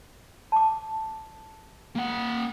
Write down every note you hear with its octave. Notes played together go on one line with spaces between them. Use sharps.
A5 D6
A#3 F#5